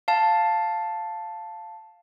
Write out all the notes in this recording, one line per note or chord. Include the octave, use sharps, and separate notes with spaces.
F5 A5